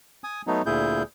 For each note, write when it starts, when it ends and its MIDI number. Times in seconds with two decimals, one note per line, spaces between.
0.24 0.42 80
0.24 0.42 87
0.47 0.62 54
0.47 0.62 57
0.47 0.62 59
0.47 0.62 63
0.66 1.03 38
0.66 1.03 46
0.66 1.03 64
0.66 1.03 68
0.66 1.03 91